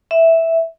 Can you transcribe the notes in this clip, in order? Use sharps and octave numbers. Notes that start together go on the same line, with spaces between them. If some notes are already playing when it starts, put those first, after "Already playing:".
E5